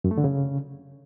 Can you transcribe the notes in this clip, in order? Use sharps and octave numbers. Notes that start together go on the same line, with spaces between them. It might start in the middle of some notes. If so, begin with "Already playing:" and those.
F#2
A3
D3
C#3